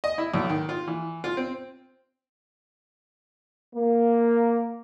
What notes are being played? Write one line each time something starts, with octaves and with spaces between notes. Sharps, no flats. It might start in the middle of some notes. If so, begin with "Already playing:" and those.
D#5
E4
B1
D#3
F4
E3
F4
C4
A#3